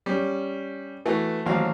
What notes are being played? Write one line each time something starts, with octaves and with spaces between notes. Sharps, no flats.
G3 C#4
E3 A3 F#4
A1 D#2 F3 F#3 F5